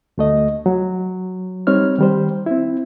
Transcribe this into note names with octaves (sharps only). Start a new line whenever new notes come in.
D2 A3 D#5
F#3
G3 C4 D#4 C#5 F6
D#3 G3 C5
C4 E4